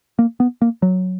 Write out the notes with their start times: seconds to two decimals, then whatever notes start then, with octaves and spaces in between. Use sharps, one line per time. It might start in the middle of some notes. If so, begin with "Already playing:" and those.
0.19 A#3
0.40 B3
0.62 A#3
0.82 F#3